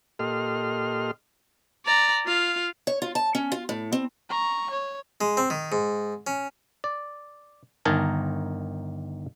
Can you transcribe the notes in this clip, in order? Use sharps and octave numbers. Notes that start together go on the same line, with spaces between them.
A#2 G4 A4 D#5 C6 F6
D5 A#5
F4 F5
C#5
F4
A5
C#4
F4
A2
C4
A#5 C#6
C#5
G#3
C4
D#3
G#2
C#4
D5
G1 D#3 D#4 A#4 G#5 A5